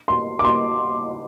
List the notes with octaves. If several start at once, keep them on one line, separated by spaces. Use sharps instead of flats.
C6
D6
C6